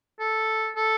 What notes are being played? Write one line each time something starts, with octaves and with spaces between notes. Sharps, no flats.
A4
A4